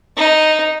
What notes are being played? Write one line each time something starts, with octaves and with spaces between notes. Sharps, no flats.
D#4